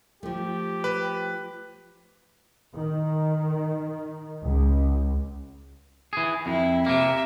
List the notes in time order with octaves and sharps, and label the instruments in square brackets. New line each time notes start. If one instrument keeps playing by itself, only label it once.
[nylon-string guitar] F3 A3 [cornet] G4
[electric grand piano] B4
[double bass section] D#3
C#2
[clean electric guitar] E3 G#4
[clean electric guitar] F2 [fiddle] E4
[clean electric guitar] C3 A#3 [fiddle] E5